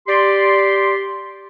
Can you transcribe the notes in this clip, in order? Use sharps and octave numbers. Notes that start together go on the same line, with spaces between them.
G4 D5 C6